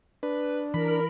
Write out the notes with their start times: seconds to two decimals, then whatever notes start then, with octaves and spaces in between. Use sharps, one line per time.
0.23 D4 B4
0.74 E3 A#4 B5